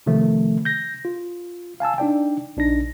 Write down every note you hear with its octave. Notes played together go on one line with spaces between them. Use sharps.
C3 D#3 F3 A3
G6 A#6
F4
F5 G#5 A5 E6
D4 D#4 D5 G5
A#1 D4 D#4 A#6